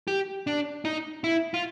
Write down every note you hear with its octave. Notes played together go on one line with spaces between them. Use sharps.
G4
D4
D#4
E4
F4